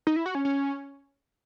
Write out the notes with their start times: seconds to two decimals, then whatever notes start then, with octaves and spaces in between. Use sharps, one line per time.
0.07 D#4
0.16 E4
0.26 F#4
0.35 C#4
0.45 C#4